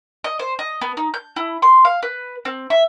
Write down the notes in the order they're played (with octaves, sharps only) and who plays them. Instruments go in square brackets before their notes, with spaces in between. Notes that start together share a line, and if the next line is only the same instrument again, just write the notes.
[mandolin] D#5
C5
D#5
B3
D#4
G6
E4
C6
F5
B4
C4
E5